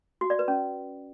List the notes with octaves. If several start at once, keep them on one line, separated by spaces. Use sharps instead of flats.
F#4
D5
B4
C#4